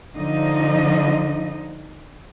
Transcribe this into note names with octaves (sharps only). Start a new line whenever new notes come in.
D3 F3 D#4 D#5